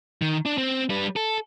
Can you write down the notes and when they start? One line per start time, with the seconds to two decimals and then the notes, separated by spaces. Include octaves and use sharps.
0.22 D#3
0.46 D4
0.58 C4
0.90 G3 B4
1.16 A4